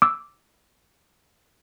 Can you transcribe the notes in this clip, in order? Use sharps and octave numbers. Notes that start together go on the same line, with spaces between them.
D6 E6